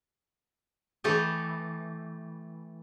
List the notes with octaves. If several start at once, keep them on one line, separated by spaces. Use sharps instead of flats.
E3 A3 G4 A4 D#5